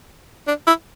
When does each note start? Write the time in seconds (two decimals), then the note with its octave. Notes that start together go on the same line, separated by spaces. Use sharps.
0.47 D4
0.67 E4